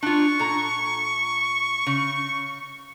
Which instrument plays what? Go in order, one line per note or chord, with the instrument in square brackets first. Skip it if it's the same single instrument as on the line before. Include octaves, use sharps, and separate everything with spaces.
[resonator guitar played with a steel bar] D4 F4 [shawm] C#6
[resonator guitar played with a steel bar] A#2 A4 A#5
C#3